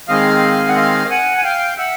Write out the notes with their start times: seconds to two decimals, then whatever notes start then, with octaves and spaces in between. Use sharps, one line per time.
0.08 D#3 G#3 C4 D#5 F5
0.68 F#5
0.76 D#5 F5
1.11 F#5 G#5
1.38 G#5
1.43 F5 G5
1.78 E5 F#5